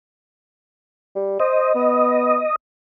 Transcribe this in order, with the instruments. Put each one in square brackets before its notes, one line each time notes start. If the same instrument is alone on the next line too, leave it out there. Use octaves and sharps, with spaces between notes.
[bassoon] G3
[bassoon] C5 [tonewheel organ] D#5
[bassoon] B3